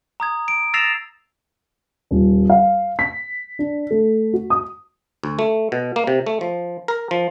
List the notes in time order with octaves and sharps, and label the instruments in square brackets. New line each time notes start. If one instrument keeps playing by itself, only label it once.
[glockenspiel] A#5 D#6 G#6
D7
E6 A6 A#6 C7 E7 F7
[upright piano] D#1
F5
B6
D4
A3
F#4
D#6
[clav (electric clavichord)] D2
A3
B2
A#3
C3
A3
F3
A#4
F3